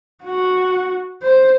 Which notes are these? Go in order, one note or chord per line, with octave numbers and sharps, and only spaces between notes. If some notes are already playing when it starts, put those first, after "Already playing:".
F#4
C5